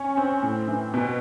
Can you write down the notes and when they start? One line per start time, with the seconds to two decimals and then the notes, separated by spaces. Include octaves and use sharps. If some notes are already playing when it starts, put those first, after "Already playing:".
Already playing: C#4
0.17 C4
0.43 A2
0.68 E3
0.94 B2